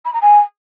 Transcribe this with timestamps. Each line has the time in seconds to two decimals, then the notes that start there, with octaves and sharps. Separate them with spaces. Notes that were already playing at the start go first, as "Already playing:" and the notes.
0.05 B5
0.13 A#5
0.21 G#5